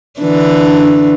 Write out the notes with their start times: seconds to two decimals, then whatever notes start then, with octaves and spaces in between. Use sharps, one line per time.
0.20 D3 E3 D4